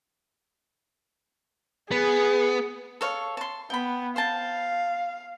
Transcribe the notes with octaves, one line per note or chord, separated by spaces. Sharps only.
B3 G#4
A4 C#5 F5
A5 C6
B3 G5 B5
C5 F5 G5 A5